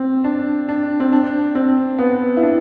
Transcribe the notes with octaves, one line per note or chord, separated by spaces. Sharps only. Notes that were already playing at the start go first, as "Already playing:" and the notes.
Already playing: C4
D4
D4
C4
D4
C4
B3
E4
D4